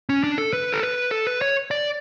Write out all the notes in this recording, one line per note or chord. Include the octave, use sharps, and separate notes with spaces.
C#4
D4
A4
B4
A4
B4
A4
B4
C#5
D5